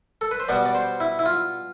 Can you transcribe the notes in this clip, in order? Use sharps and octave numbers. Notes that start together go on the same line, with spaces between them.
A4
B4
C5
B2 G3 B3 D5
D5
C5
E4
E4
F4